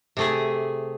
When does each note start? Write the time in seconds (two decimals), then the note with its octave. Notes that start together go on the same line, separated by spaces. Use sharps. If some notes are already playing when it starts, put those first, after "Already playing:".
0.17 C3 A3 G#4